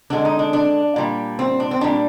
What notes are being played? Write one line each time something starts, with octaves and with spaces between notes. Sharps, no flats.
D3 G#3 D4
D#4
D4
D4
A#2 G3
C4
D4
C4
A#2 G3 D4